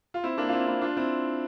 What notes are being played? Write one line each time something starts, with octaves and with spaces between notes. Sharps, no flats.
F4
C4 E4
A#3 D4
F4
C4 E4
C4 E4
D4 F4
C4 E4